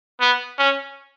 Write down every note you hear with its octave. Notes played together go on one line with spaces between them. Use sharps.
B3
C#4